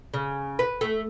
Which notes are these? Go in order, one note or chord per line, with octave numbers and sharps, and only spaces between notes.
C#3
B4
A3